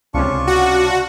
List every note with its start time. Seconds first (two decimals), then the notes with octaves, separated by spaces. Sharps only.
0.14 C#2 C3 C#4 D4 F4 C#6
0.47 F#4